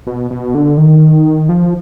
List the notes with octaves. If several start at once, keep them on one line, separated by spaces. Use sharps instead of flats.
B2
B2
D3
D#3
F3